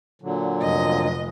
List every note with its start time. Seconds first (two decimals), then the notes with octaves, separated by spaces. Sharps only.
0.22 A#2 D3 F#3
0.62 F1 D#5